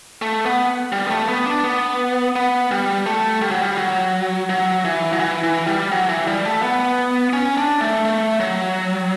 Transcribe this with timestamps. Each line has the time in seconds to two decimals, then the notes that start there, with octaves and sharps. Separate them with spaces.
0.22 A3
0.46 B3
0.92 G3
1.06 B3
1.10 A3
1.29 B3
1.46 D4
1.64 B3
2.36 B3
2.71 G3
3.06 A3
3.42 G3
3.51 F#3
3.62 G3
3.78 F#3
4.50 F#3
4.85 E3
5.13 F#3
5.20 E3
5.43 E3
5.67 G3
5.92 F#3
6.09 E3
6.27 G3
6.45 A3
6.62 B3
7.33 C#4
7.57 D4
7.81 A3
8.05 A3
8.40 F#3